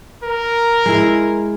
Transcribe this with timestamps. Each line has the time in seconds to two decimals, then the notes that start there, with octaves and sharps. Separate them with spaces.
0.23 A#4
0.86 G#3 E4